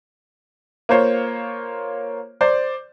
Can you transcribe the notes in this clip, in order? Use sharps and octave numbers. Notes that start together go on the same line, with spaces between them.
A#3 F4 C5 C#5
C5 D5